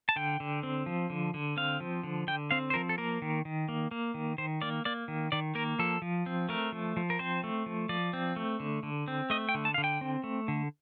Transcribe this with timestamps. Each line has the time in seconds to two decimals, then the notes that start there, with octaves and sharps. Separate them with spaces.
0.09 A5
0.16 D3 G5
0.40 D3
0.63 C4
0.86 F3
1.10 D3
1.34 D3
1.57 C4 F5
1.80 F3
2.03 D3
2.27 D3 G5
2.51 C4 F5
2.70 C5
2.74 F3 A#4
2.89 A4
2.98 A#3 A#4
3.22 D#3
3.45 D#3
3.69 A#3
3.91 A#3
4.14 D#3
4.38 D#3 C5
4.62 A#3 D5
4.85 A#3 D5
5.08 D#3
5.32 D#3 D5
5.55 A#3 A#4
5.79 F3 A4
6.02 F3
6.26 C4
6.49 A3 A#4
6.72 F3
6.97 F3
7.10 A#4
7.19 C4 C5
7.44 A3
7.66 F3
7.89 F3 D5
8.13 C4
8.36 A3
8.60 D3
8.83 D3
9.08 C4
9.30 A3 D#5
9.49 G5
9.54 D3
9.65 A5
9.74 F5
9.78 D3
9.84 G5
10.01 C4
10.24 A3
10.48 D3